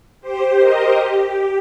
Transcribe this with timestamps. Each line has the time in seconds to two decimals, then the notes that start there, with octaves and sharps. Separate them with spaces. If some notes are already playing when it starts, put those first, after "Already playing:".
0.22 G4 C5
0.59 A#4 D#5
0.95 G4